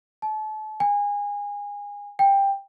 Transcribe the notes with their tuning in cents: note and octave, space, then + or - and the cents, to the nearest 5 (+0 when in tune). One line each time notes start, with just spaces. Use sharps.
A5 -35
G#5 -25
G5 +15